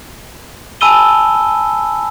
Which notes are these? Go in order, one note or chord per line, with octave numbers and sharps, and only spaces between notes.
G#5 A5 B5 E6 D#7 G7